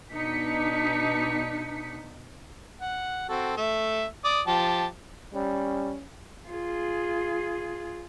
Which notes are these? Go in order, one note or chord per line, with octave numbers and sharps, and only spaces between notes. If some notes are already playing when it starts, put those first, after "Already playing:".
B2 D4 D#4 B6 C#7
F#5
C4 F#4 A4
A3 E5
D5 D6 D#6
F3 G4 A5
G3 C#4
F4 G#4